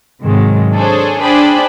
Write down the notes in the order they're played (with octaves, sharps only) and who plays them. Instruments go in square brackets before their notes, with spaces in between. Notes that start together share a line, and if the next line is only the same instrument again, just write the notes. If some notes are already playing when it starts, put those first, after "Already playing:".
[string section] G#2 C3 D#3 F#3 G#3
D4 G#4 A4 C5 C#5
D4 G#4 C5 G5 B5